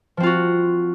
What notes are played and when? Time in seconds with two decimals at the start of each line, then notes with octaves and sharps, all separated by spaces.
0.17 F3
0.20 C4
0.23 F4
0.26 F#4